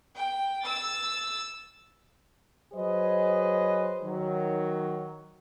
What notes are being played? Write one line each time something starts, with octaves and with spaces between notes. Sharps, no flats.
G5
E6 A6
F#3 G#4 B4 C5 D#5
D#3 F#3